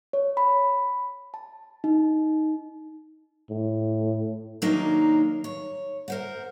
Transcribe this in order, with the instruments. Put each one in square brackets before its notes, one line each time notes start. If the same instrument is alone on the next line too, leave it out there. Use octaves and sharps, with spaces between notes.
[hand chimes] C#5
B5
A5
D#4
[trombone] A2
[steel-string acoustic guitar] D#3 F#3 A#3 D4 D#4
C#5
A#4 C5 F#5